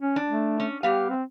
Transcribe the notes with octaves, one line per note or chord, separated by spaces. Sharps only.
C#4
D4
A3
C#4
G3 B3 G4 F5
C4